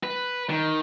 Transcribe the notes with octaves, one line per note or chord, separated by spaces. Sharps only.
B4
D#3